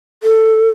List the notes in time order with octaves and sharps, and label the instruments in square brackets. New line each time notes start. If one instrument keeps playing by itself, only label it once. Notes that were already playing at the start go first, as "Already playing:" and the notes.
[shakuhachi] A4